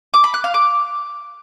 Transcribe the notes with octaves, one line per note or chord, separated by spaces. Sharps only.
D6
B5
F#6
F5
D6